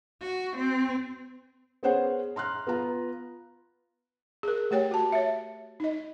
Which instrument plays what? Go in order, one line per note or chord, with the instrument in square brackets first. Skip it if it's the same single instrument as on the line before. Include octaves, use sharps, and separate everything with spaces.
[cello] F#4
C4
[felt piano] B3 C#4 G#4 C5 C#5 F#5
A#5 C6 F6 F#6
B3 F4 A#5
[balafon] G#4 A#4
A3 G4 C#5 G5
F#4 A5
C#5 E5
D#4 D#5